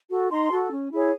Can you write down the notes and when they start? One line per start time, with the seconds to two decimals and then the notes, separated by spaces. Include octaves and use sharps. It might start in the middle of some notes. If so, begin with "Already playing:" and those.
0.10 F#4 A4
0.31 D#4 A#5 C6
0.51 F#4 A4
0.71 C#4
0.92 E4 G#4 C#5